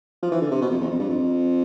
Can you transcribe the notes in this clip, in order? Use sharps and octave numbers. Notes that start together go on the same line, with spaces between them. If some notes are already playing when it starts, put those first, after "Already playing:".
F3
E3
D3
C3
B2
F2
E2
F2
G2
F2